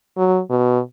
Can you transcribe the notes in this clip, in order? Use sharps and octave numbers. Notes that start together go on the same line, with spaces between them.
F#3
B2